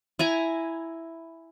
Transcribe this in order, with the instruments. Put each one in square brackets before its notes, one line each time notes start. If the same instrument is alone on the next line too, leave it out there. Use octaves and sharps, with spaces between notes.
[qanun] E4 G#5 A#5